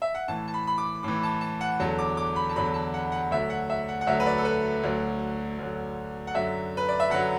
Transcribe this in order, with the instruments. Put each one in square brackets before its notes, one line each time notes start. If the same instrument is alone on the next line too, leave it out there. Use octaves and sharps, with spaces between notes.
[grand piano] E5
F#5
A2 E3 A5
A5
B5
B5
D6
A2 E3 D6
A5
A5
F#5
E2 D3 F#3 A5
D6
D6
B5
A5
E2 D3 F#3 B5
A5
F#5
F#5
D2 D3 F#3 E5
F#5
E5
F#5
F#5
D2 D3 F#3 E5
B4
D5
A4
B4
D2 D3 F#3
D2 D3 F#3
F#5
F#2 D3 F#3 E5
B4
D5
E5
F#2 D3 F#3 F#5